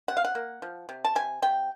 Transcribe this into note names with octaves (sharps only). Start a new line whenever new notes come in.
C3 F#5
F5
F#5
A#3
F3
C3
A5
C3 G#5
C3 G5